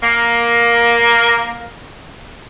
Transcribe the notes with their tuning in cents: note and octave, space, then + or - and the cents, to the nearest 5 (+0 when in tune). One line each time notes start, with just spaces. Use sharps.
A#3 +10